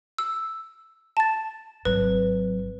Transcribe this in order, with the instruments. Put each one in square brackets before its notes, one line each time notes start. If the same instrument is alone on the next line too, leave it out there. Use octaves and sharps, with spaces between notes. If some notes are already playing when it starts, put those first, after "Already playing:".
[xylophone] E6
A5 A6
[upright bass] G#1 F#3 [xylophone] B4